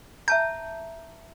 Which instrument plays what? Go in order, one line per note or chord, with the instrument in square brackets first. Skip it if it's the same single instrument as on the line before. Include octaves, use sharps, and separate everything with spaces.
[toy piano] E5 A5 A#5 [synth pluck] G6